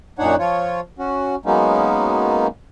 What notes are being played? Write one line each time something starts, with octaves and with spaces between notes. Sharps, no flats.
F#2 A#2 D4 D#4 C#5 F#5
F3 F4 C#5
C#4 F#4
F#3 G#3 A#3 B3 C#4 D#4